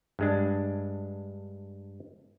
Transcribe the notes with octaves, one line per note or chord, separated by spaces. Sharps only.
G2 G#3 D4